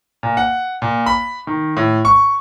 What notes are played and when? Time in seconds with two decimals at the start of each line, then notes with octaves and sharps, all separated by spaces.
0.23 A#2
0.37 F#5
0.82 A#2
1.06 B5
1.47 D#3
1.77 A2
2.05 C#6